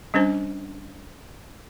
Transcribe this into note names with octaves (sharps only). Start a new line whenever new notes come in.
G3 C#4 D4 C5